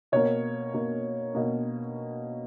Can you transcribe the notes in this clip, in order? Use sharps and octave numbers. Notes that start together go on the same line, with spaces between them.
B2 A#3 C#5
B2 A#3
B2 A#3